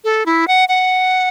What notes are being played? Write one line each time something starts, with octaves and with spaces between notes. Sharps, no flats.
A4
E4
F#5
F#5